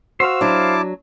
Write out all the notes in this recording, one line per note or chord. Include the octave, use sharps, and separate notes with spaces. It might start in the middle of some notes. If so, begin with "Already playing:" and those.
F#4 C5 F5 E6
F#3 D4 E4 A5 D6